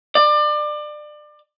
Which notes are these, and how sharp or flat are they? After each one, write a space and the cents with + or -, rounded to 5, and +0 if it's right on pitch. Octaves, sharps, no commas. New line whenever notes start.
D5 +30